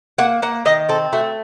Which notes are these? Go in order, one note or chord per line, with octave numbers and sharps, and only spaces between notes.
A#3 F#5
A#3 F#5
D#3 D#5
C4 A4
A3 F#4